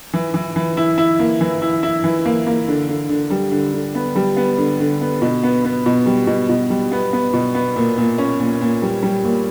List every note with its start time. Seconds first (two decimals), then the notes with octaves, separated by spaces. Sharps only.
0.13 E3
0.34 E3
0.56 E3
0.77 E4
0.98 E4
1.19 A#3
1.41 E3
1.62 E4
1.83 E4
2.04 E3
2.25 A#3
2.47 A#3
2.68 D3
2.89 D3
3.09 D3
3.31 G3
3.52 D3
3.74 D3
3.95 B3
4.16 G3
4.37 B3
4.58 D3
4.80 D3
5.01 B3
5.22 B2
5.44 B3
5.65 B3
5.86 B2
6.06 G3
6.27 B2
6.49 B2
6.70 G3
6.92 B3
7.13 B3
7.33 B2
7.55 B3
7.76 A#2
7.98 A#2
8.18 C#4
8.40 A#2
8.61 A#2
8.82 G3
9.03 G3
9.24 A#2